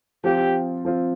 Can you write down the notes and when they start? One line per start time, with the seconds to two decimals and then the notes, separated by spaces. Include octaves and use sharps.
0.24 F3 C4 F4 G4
0.85 F3 C4 F4